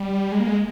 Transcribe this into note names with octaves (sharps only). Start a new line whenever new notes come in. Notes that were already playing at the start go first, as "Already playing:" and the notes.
Already playing: G3
G#3
A#3
G#3